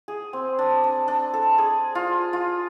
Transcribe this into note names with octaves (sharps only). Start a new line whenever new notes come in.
G#4
C4
D4
D4
D4
A4
G#4
F4
F4